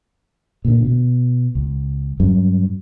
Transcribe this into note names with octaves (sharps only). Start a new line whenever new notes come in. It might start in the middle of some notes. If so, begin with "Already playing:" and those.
A#2 D3
B2
C#2
G2 F#3 C#4